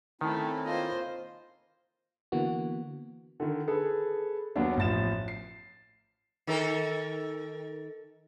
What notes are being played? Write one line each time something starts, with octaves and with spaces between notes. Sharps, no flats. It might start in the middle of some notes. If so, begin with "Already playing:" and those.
D#3 A3 C4 C#4 E4
A#3 F4 C5 D#5
D3 E3 A#3 B3 F#4
D3 D#3
G#4 A4 B4
D#2 F#3 B3 D4
A1 F3 A6 E7
C7
D#3 A4 A#4